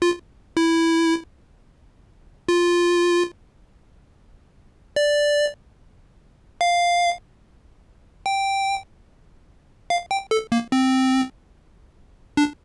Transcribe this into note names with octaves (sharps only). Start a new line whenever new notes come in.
F4
E4
F4
D5
F5
G5
F5
G5
A4
A#3
C4
D4